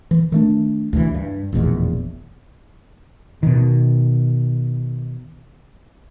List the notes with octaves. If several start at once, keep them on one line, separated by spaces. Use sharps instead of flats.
E3
D#3 A3 D4
D2 C3 E3
G2
F1 A#1 E2 B2
B2 D#3